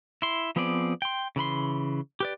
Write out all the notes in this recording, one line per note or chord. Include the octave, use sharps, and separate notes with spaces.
E4 C6
F3 B3 C4 G#4 D5
G5 C6
C#3 E3 B5 C6
G4 B4 D5